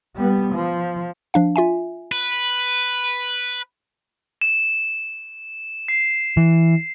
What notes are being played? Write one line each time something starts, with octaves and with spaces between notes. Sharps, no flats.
G3 B3
F3
F3 D4 F5
F4 E5 G#5
B4
E7
C7
E3